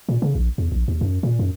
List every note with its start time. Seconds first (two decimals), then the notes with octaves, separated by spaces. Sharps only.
0.09 A#2
0.22 C#3
0.35 A#1
0.58 E2
0.72 A#1
0.88 D#2
1.01 F#2
1.23 A#2
1.39 F#2